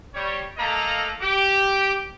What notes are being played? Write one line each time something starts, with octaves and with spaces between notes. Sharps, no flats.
G3 C#5
A3 A#3 A4 D#5 F5 A#5
G4 D6